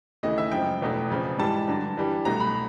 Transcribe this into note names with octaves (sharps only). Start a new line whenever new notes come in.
D#2 C#3 E3 A3 D#5
E5
F#2 C#3 F3 G#3 G5
E2 B2 F#3 A3
F2 C#3 F3
G#2 E3 G3 A5
G2 D3 F#3
G2 E3 G3
C2 B2 F#3 A3 A#5
B5